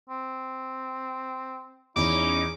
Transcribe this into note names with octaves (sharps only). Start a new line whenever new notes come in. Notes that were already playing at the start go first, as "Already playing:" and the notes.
C4
E2 C#4 D#4 E4 D6